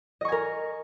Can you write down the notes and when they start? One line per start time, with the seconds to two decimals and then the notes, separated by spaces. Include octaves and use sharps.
0.21 D#5
0.25 C#6
0.28 G#5
0.32 A#4